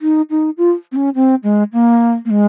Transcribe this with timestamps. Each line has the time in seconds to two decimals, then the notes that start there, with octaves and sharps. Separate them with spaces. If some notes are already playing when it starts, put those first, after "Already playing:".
0.02 D#4
0.30 D#4
0.58 F4
0.92 C4
0.96 C#4
1.15 C4
1.43 G#3
1.73 A#3
2.25 A#3
2.30 G#3